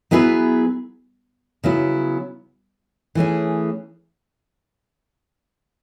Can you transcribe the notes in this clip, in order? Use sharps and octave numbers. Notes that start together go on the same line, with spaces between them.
F#3 B3 E4 G#4 B4
C#3 F#3 B3 E4
E3 A3 C#4 G#4